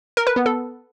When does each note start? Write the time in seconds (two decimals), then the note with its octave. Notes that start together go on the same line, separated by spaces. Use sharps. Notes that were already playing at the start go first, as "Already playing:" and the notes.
0.17 A#4
0.27 B4
0.36 B3
0.46 A4